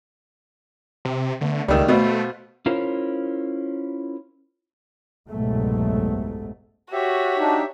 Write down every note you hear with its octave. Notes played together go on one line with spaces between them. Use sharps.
C3
D3 A3 B3
C#2 D#3 G3 A3 E6
B2 A3 F#4 C5 F5
C#4 E4 F4 A#4 C5 C#5
F#1 C2 G#2 B2 F#3 A3
F#4 G4 C#5 E5
D4 D#4